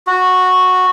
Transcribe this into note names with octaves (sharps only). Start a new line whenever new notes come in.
F#4